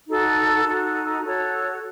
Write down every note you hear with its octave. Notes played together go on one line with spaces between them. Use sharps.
D#4 F#4 A4
D#4 F#4 A4
F#4 A4 C#5